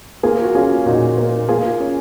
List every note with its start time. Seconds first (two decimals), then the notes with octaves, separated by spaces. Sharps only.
0.23 A#3 F4 G#4
0.44 F#4
0.55 C#4 F4 G#4
0.86 A#2 D#4 F#4
1.18 A#3
1.49 A#3 F4 G#4
1.80 C#4